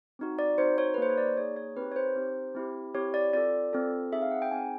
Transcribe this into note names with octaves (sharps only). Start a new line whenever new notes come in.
C4 D#4 F#4
D5
C4 D#4 F#4 C5
C#5
B4
A#3 D#4 G#4 C5
C#5
D5
A#3 D#4 G#4 C#5
C#5
C4 D#4 G4 B4
C#5
C5
C4 D#4 G4
C4 E4 G4
C4 E4 G4 C#5
D5
C4 F4 A4 D5
C4 F4 A4
C4 D#4 G#4 E5
F5
F#5
G5
C4 D#4 G#4 G#5